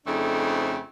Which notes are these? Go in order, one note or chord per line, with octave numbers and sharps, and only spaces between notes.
F2 C#3 A3 C4 D4 D#4